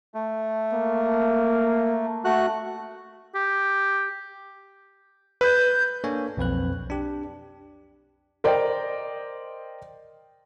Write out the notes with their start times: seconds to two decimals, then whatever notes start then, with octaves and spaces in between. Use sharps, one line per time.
0.14 A3
0.73 A#3
2.25 A3 F#4 F#6
3.35 G4
5.41 B4 G6
6.04 A#3 D4 A4 C#5 G#5
6.37 B1 F2 C4 B4 F#6
6.90 D4 G4
8.44 A#4 C5 D5 D#5 G5